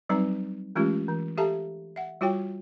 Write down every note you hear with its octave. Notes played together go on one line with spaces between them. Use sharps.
F#3 G3 C4 D#4 B4 A#5
E3 G#3 A3 C#4 F4 G4
E3
G4 A4 E5 F5 A5 A#5
E5 F#5
G3 F4 F#4 C#5 G5